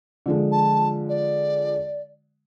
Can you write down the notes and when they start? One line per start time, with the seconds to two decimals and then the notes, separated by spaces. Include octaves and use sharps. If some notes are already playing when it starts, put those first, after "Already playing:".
0.26 D3 F3 G#3
0.52 A5
1.09 D5